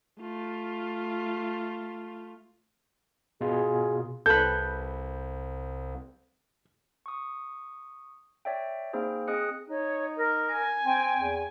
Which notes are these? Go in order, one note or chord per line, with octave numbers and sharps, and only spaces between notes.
A3 F4
B2 F4 G#4
C2 A4 B4 G6
C#6 D#6
C#5 D5 E5 G5
A#3 C4 D#4 G#4 C5
C4 G#4 D#5 D#6 F#6 C#7
D#4 C#5
A#4
G#5
C4 G5
E2